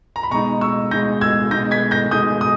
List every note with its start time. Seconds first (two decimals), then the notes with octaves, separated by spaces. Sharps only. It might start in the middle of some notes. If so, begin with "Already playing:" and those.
0.16 A#5
0.23 B5
0.31 B2 G#3 D#4 A#5 C#6
0.61 C#6 E6
0.91 B2 G#3 D#4 G6 A#6
1.21 E6 G#6
1.51 B2 G#3 D#4 G6 A#6
1.71 G#6 B6
1.91 G6 A#6
2.11 B2 G#3 D#4 D#6 G6
2.41 D#6